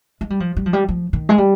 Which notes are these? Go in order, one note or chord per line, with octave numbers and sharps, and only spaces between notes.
G#3
G3
F3
G3
F3
G3
F3
D#3
G#3
G3